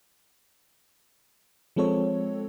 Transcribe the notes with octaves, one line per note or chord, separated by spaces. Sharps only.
F3 G#3 C4 A4 C#5